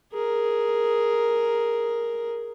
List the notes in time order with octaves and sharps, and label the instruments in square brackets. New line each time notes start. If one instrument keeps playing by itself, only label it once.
[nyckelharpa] G#4 A#4